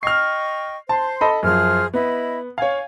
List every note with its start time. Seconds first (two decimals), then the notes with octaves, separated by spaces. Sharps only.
0.03 D#5 G5 C#6 F6 C7
0.89 C5 A5 C6
1.21 A4 D#5 B5
1.43 F#2 F3 G#4 C5 F6
1.94 B3 E4 D#5 B5
2.58 C#5 F5 G#5